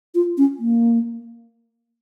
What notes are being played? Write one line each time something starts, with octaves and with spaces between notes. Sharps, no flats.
F4
C#4
A#3